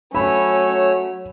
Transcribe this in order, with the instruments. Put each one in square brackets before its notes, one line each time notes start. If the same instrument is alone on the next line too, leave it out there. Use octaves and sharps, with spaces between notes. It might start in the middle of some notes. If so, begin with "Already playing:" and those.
[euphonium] F#3 [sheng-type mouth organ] A3 C#5 E6 [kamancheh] C#4 [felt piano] B5